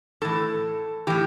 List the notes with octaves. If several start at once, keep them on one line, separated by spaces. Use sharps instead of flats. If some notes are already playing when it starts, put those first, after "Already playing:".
A2 E3 A4
A2 E3 G4